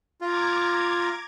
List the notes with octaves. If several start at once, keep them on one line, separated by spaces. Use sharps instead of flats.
F4 A#5 D6 G#6